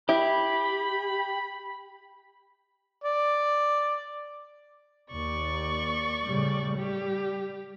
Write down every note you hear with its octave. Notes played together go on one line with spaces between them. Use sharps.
E4 G4 B5
D5
D#2 D5 C#6
A2 C#3 G3
G3 G4